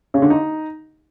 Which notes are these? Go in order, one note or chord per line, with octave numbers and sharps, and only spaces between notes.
C#3
D3
D#4